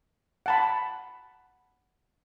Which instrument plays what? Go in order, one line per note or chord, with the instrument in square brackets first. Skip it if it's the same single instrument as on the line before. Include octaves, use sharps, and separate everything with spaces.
[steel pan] F#5 A5 B5